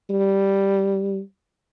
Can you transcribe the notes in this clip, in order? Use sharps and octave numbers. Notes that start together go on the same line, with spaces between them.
G3